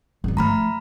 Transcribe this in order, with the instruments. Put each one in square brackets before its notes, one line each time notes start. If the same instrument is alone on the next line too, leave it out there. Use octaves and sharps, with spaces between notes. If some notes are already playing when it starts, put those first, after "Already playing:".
[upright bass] G#1 D#4
[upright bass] F3 A3 [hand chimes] A#5 B5 F6